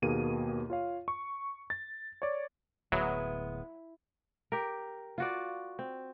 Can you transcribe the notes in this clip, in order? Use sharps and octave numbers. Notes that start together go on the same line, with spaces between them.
D#2 B2 A#3 G#4 D#7
F4 C#5 F5
C#6
A6
C#5 D5
D1 F#3 G#3 B3 E4
G4 A#4
F4 F#4 D5
C4